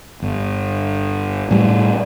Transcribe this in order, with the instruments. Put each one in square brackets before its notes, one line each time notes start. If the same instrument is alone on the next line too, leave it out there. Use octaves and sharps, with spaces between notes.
[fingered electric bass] G1
A2 G3